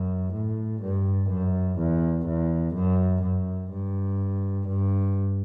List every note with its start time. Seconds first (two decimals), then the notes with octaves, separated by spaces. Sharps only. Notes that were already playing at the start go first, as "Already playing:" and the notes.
Already playing: F#2
0.33 A2
0.81 G2
1.29 F#2
1.78 E2
2.26 E2
2.74 F#2
3.22 F#2
3.71 G2
4.68 G2